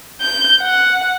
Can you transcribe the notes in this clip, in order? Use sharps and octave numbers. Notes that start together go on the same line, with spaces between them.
G6
F#5